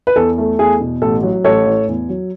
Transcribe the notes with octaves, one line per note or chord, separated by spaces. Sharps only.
B4
E2 A4
A3
E2 G#4
B2
A1 A4
F#3
A1 A4 C#5
A2
E2
F#3